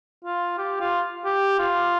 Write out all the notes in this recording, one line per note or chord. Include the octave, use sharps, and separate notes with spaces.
F4
G4
F4
G4
F4